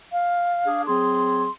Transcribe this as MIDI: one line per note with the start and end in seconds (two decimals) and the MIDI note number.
0.12 0.82 77
0.65 0.83 62
0.65 0.83 68
0.87 1.45 54
0.87 1.45 60
0.87 1.45 68
0.87 1.51 84